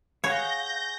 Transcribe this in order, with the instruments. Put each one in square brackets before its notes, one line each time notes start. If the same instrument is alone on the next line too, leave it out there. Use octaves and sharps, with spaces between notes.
[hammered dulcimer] G#4 F#5 C#6 [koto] C#5 [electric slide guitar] F5 [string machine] G6 A#6